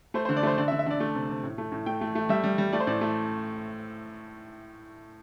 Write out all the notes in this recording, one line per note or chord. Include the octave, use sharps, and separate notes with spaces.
A3 C5
C5
D3
D5
A3 C5
D3 D5
E5
D3
E5
D3 D5
A3
C3
C3
A2
A3
A2
A3 G5
A3
A3
G3 E5
G3
G3
A3 D5
C5
A2 D5
A3